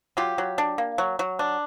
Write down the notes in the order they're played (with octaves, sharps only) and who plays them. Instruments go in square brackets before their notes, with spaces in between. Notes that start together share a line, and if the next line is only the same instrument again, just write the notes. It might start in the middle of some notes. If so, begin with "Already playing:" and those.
[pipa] F#3 F4 G4
F#3
D4
A#3
F#3
F#3
D4